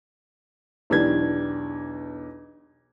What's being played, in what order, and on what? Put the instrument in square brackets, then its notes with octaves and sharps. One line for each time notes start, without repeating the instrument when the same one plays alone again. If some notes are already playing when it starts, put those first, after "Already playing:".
[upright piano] B1 E2 D4 G4 B4 G#6